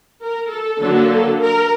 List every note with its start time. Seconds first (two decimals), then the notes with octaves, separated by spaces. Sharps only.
0.22 A#4
0.52 A4
0.81 D3 F#3 A#3 D4
1.41 A#4